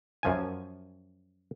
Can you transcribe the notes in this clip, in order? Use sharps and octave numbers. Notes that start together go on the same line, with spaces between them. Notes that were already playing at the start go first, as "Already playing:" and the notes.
F#2 F3 G#5